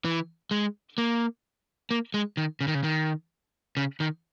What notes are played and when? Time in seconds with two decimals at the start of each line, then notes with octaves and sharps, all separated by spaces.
0.05 E3
0.51 G#3
0.98 A#3
1.91 A#3
2.14 G#3
2.37 D#3
2.61 C#3
2.68 D#3
2.75 C#3
2.84 D#3
3.77 C#3
4.00 D#3